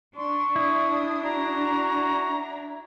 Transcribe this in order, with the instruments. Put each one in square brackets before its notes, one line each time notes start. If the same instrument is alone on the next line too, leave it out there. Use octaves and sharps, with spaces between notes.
[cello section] D4 [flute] C6 [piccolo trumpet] C#6
[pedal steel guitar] E4 [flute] D#6
[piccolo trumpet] F#4 [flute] A#5